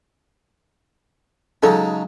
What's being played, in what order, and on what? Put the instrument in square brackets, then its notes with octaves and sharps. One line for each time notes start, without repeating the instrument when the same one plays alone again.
[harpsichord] C#3 F#3 G#3 [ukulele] D#4 A4